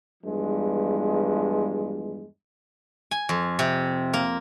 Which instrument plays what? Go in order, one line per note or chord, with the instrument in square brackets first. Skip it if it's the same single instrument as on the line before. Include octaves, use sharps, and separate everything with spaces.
[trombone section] E2 G2 F3 G#3
[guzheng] G#5
F2
C3
A#3